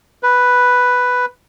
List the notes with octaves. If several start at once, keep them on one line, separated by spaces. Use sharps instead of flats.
B4